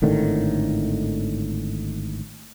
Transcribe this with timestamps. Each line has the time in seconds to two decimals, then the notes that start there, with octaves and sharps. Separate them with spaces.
0.02 G#1 A2 D3 D#3